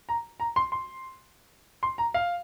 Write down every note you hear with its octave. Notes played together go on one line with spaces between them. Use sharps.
A#5
A#5
C6
C6
C6
A#5
F5